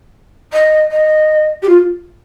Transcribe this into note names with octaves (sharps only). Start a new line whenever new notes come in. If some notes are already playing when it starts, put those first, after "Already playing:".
D#5
D#5
G4
F4